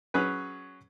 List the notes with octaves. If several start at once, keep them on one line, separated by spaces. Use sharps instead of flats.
F#3 C#4 G#4 B4